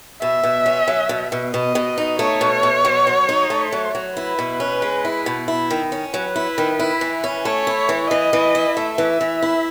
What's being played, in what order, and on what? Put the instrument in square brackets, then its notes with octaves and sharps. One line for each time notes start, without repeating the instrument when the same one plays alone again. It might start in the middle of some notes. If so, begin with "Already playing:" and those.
[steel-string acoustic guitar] B2 [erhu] E5
[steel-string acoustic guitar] B2
C#4
F#3
B2
B2
[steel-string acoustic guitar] B2 [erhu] D#5
[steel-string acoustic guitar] B2
D#4
[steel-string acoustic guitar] A3 [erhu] C#5
[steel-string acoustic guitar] B2
B2
F#3
F#3
D#4
A3
F#3
F#3
[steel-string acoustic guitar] E4 [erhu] B4
[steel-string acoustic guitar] B2
C#4
G#3
E4
B2
E4
D#3
C#4
[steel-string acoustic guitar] F#3 [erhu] B4
[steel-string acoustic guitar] E4
D#3
E4
E3
C#4
[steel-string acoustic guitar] A3 [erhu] C#5
[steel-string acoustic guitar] E4
E3
[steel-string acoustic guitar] E3 [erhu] D#5
[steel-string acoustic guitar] E3
E4
[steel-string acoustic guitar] A3 [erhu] E5
[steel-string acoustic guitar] E3
E3
E4